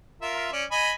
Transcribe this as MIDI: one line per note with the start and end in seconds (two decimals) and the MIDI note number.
0.22 0.48 65
0.22 0.48 70
0.22 0.48 76
0.52 0.64 61
0.52 0.64 74
0.71 0.92 75
0.71 0.92 80
0.71 0.92 83